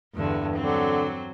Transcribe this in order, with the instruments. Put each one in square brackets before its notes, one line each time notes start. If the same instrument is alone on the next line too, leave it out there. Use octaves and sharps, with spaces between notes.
[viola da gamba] E2 G2 D3
[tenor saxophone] D3 [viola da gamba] F#3 C4